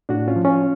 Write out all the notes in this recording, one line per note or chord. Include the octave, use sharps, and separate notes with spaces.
A2 D4 F#4
C#4 F4
F3
C#4 F4